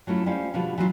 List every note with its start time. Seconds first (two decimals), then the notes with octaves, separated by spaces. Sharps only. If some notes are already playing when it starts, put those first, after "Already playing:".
0.07 F#3 A3 C#4 E4 F4
0.26 G3 A3 C#4 F4 C5 F5
0.54 B2 D3 F3 G3 F4
0.78 E3 F#3 C#4 D#4 F4